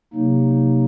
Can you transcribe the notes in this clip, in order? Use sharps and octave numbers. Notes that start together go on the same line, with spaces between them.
C3 F#3 A#3 D#4